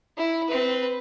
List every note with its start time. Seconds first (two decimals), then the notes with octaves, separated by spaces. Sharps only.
0.17 E4
0.48 C4 B4